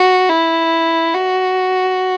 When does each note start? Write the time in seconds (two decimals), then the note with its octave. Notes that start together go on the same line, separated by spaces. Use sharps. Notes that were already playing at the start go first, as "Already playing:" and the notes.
Already playing: F#4
0.29 E4
1.14 F#4